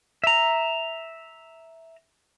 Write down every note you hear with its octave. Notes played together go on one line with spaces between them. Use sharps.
E5 A#5